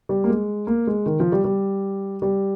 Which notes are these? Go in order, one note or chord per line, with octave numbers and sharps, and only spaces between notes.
G3
A#3
G#3
A#3
G#3
D#3
F3
G3
G3
G3